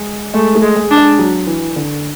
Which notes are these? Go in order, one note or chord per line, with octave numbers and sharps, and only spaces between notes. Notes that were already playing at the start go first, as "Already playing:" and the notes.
Already playing: G#3
G#3 A3
A3
G#3
G#3
D4
G#3
F#3
E3
D3